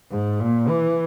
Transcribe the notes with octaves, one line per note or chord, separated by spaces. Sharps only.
G#2
A#2
E3